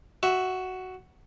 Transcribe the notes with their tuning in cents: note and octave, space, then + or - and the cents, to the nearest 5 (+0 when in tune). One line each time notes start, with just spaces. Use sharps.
F#4 +5 E5 +0